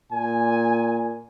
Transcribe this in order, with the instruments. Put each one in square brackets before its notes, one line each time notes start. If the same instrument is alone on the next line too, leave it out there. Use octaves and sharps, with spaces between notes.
[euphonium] A#2 [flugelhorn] G#5